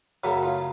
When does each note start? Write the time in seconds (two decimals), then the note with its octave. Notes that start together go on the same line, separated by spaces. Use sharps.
0.24 F#2 C#3 F#3 A3 B4
0.43 F4